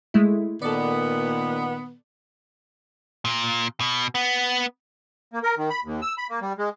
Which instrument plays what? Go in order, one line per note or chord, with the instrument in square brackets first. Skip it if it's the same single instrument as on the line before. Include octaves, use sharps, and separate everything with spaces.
[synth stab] G#3 A3 E4
[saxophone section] A#2 D#3 B3 [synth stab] A4 D5
[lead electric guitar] A#2
B2
B3
[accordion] A#3
A#4
D#3
B5
D#2
E6
B5
A#3
G3
G#3